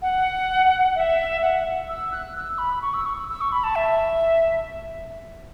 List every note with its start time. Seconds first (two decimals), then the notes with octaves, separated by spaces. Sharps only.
0.02 F#5
0.95 E5
1.42 F#5
1.89 E6
2.12 F#6
2.36 E6
2.58 B5
2.82 C#6
2.94 E6
3.06 C#6
3.17 E6
3.29 E6
3.41 C#6
3.52 B5
3.64 A5
3.76 E5